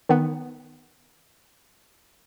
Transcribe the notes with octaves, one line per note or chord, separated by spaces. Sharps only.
D#3 B3